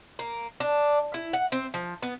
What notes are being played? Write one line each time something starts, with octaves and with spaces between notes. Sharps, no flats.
A#3
D4
E4
F#5
C4
F3
B3